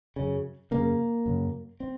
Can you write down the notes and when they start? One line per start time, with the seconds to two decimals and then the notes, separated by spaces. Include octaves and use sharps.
0.16 F#2 C#3
0.71 F#2 C#3 A#3
1.26 F#2 C#3
1.80 C4